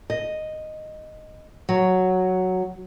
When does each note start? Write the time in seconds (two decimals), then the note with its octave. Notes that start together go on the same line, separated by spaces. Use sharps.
0.10 D#5
1.69 F#3